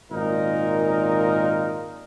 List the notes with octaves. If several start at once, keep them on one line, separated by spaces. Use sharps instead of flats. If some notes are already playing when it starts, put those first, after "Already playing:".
G#1 A#2 D#4 A#4